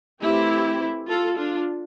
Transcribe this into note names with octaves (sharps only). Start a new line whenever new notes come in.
E3 A3 C4 E4 G4
F4 A4
D4 F4